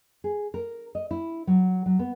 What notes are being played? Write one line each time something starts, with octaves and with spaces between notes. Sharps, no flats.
G#4
A#4
D#5
E4
F#3
F#3
B3